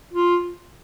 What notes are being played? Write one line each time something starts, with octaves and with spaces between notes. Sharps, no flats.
F4